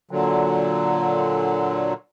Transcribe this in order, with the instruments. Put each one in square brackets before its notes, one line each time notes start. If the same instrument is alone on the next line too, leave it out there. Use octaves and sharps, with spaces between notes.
[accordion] A#2 D3 F#3